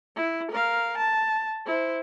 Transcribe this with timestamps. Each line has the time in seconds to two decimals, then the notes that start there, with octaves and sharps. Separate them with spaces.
0.16 E4
0.52 A#4 F5
0.98 A5
1.66 E4 C5